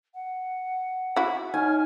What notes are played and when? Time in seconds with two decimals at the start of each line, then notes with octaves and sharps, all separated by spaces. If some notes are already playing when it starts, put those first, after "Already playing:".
0.14 F#5
1.16 E4 F#4
1.54 D#4 C#5 F#5 G#5 F6